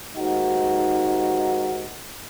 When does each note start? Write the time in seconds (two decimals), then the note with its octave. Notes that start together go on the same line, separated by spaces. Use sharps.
0.15 D#2 G#2 D#4 F#4